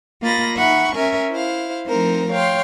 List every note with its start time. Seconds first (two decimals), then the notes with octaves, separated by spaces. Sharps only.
0.22 A#3 F4 D#5 B5 A6 A#6
0.56 D#4 E5 F#5 B5 C#6
0.95 C#4 A#4 E5 G#5
1.31 E4 C5 F5
1.87 F3 A3 C4 D#4 A#4 C5
2.32 C#5 F5 G5 C6